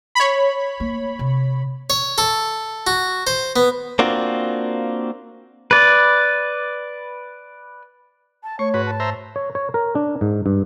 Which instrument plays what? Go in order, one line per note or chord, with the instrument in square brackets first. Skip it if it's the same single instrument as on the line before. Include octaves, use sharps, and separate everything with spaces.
[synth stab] C#5 B5
[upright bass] A#3
C3
[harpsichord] C#5
A4
F#4
C5
B3
[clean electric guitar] A#3 C4 D4 F4 F#4
[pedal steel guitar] B4 D5
[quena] A5
[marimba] A3 [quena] C#5 [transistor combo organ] C#6
[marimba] G#2 [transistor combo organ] F#4 B4
[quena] A5
[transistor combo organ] C5 E5 A#5
[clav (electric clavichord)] C#5
C#5
A#4
D4
G#2
G2